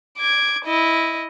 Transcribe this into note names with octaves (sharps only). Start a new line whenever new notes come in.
D6 G#6
E4 D#5